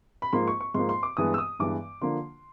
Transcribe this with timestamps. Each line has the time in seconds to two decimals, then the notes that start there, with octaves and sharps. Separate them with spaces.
0.22 B5
0.33 G#2 F3 A#3 C6
0.47 C#6
0.61 C#6
0.74 G#2 F3 A#3 C6
0.89 C6
1.03 D6
1.17 G2 E3 G#3 B3 D#6
1.34 E6
1.38 D#6
1.59 G2 E3 G#3 B3 D6
2.01 D3 F3 A#3 D4 C6